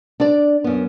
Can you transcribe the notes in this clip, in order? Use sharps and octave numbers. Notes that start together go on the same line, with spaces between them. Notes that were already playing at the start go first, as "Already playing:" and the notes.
D4 D5
F#2 B3